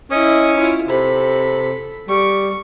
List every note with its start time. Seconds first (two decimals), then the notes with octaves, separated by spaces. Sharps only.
0.11 C#4 E4 D#5
0.56 E4 F4
0.89 C3 A4 B5
2.09 G3 C#6